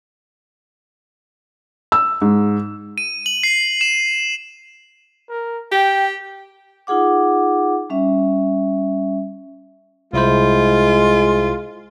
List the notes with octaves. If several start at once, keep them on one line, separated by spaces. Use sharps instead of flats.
E6
G#2
D#7
F#7
C7
E7
A#4
G4 G5
D#4 F4 G#4 F#5 D6
G3 C#4 E5
C2 G#3 E4 F4 C5